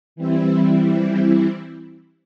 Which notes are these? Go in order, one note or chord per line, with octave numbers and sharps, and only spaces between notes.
E3 G3 C4 E4